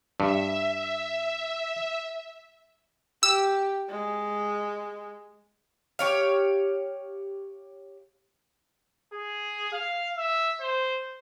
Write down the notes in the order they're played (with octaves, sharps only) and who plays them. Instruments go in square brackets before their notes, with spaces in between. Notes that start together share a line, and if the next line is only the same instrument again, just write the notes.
[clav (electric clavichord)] G2 [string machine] E5
[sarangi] G4 [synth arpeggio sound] E6
[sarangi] G#3
[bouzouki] G4 C#5 F5
[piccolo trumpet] G#4
F5
E5
C5